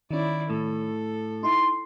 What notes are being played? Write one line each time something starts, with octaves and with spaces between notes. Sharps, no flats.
D#3 C#4 E4 D5
A2 A4
D#4 E4 C6